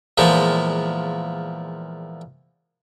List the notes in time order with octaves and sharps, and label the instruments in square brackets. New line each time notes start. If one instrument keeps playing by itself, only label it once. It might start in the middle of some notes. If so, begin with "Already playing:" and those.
[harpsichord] E2 A#2 F3 G#3